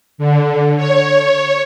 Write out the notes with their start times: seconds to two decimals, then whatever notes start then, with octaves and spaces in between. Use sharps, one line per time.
0.18 D3
0.77 C#5